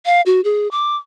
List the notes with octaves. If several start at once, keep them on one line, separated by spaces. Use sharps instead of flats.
F5
F#4
G#4
D6